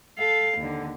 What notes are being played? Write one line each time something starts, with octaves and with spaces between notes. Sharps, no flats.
A4 F5
D#2 D3